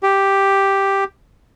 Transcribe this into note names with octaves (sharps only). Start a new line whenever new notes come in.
G4